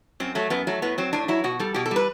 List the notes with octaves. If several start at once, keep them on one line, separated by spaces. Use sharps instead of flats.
F#2 C4
F#3 A3
F#2 B3
F#3 A3
A2 B3
F#3 C4
A2 D4
F#3 E4
B2 F#4
G3 A4
B2 G4
A4
G3 B4